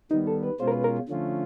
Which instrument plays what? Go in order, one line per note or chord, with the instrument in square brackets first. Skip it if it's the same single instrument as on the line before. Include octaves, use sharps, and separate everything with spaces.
[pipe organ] D#3 G3 B3 [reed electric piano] D#4
[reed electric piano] A4
B4
[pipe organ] B2 G#3 C#4 F4 [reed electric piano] C5
[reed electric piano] A#4
B4
A#4
[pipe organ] D3 F3 A3 C#4 F4